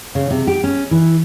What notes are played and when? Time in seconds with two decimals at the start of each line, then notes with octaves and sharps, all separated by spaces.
0.15 C#3
0.31 C3
0.47 G4
0.64 C#4
0.91 E3